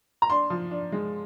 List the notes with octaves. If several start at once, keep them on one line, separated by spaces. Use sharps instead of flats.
A#5
D4 C6
F3
D4
G#3